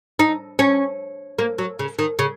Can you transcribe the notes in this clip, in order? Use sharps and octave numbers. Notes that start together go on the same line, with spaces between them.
D#4
C#4
A#3
F#3
C#3
D#3
C#3